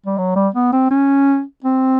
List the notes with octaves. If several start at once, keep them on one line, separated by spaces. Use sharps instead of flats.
G3
F#3
G3
B3
C4
C#4
C4